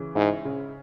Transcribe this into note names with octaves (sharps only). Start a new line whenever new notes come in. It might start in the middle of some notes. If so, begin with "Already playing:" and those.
Already playing: C#3 E3
G#2 E4
C#3